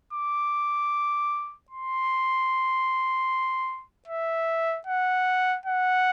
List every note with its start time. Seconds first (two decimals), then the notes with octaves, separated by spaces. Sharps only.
0.13 D6
1.71 C6
4.08 E5
4.87 F#5
5.66 F#5